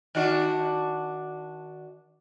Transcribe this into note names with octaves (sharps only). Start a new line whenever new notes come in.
D#3 D4 F#4